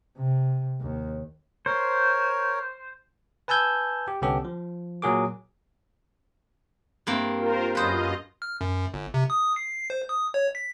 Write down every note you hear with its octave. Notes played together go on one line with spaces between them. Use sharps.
C3
D#2
A#4 C5 C#5
B4 G#5 A5 E6 G6 G#6
G4
C2 D3 B3 C#4 G4 A4
F3
A#2 F#3 G#4 A#4 D6
G2 A#3 C4
F4 A#4 C5
F#2 F4 B4 C5 D#5
F6
F#2
G1
C3
D#6
C7
C5
D#6
C#5
B6